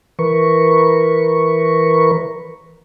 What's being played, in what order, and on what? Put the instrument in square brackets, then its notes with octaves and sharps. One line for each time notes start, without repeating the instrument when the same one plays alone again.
[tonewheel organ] E3 A#4 B4 C#6